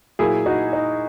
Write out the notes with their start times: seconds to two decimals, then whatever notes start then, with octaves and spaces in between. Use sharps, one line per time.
0.19 A#2 F#3 A#3 E4 G#4
0.46 D#4 F#4
0.73 D#4